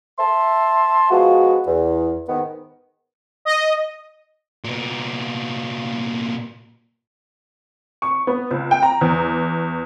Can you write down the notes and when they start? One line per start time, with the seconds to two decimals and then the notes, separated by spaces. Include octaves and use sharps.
0.19 E5 A5 C6
1.11 F3 G#3 B3 F4 F#4
1.67 E2
2.29 G#2 D#3 B3
3.45 D#5
4.64 A#2 B3
8.02 C#6
8.27 B3
8.51 C#2
8.71 G5
8.83 A#5
9.01 E2